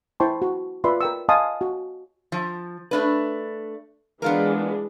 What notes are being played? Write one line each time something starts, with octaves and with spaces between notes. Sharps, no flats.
E4 C5 G5 A5 C6 C#6
F#4
F4 B4 D5 E5 B5 C6
A#4 G5 E6
D#5 F5 G#5 A5 C6 D#6
F#4
F3
A3 D4 B4
E3 G#3 B3 D4 F4 A#4